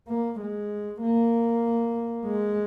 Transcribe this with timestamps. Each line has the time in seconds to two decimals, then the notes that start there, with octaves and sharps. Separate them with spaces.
0.08 A#3
0.40 G#3
1.02 A#3
2.26 G#3